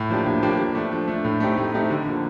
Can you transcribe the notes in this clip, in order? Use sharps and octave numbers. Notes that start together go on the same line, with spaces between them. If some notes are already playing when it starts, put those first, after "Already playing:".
Already playing: A2
F3 A#3 D4 G4
A2
F3 A#3 D4 G4
F3
A3 D4
F3
A3 D4
A2
A3 C4 D#4 G4
A2
A3 C4 D#4 G4
D3
F3 A#3